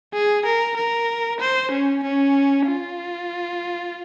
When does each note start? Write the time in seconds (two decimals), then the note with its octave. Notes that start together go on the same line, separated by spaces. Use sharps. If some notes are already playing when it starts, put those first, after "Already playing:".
0.13 G#4
0.45 A#4
0.76 A#4
1.40 C5
1.71 C#4
2.03 C#4
2.67 F4